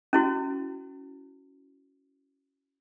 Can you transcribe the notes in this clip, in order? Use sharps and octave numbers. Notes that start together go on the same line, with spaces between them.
C#4 E4 F#4